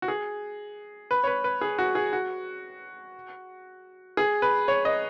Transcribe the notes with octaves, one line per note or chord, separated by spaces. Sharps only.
F#4
G#4
B4
C#5
B4
B4
G#4
F#4
G#4
F#4
G#4
B4
C#5
D#5